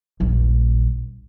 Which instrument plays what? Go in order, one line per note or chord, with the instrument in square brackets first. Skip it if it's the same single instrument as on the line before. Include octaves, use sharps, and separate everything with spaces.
[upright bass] D#1 A#1